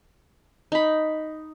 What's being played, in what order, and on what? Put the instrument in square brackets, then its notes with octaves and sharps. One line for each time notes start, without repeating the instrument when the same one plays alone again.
[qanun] D#4 B5